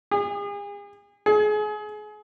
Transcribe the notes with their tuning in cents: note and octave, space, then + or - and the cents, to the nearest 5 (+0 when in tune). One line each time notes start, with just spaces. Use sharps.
G#4 -40
G#4 +30